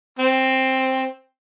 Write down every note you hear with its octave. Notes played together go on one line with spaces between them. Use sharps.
C4